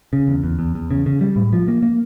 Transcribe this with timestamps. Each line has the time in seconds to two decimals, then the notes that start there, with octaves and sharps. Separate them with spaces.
0.13 C#3
0.28 E2
0.44 E2
0.59 E2
0.75 E2
0.91 C#3
1.06 C#3
1.21 G3
1.36 A2
1.53 F3
1.68 A#3
1.82 A#3